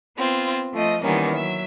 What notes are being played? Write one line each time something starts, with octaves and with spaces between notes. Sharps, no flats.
B3 C4 F4
F3 A3 D#5
D#3 E3 G3 A#3 B3 C#4
F#3 E5